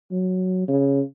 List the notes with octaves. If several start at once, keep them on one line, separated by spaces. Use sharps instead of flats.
F#3
C#3